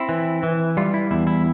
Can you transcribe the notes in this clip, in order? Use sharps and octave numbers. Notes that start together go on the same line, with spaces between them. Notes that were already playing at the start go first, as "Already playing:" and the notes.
Already playing: C4 E4
E3
E3
G3 F4
E4
E2 E4
E4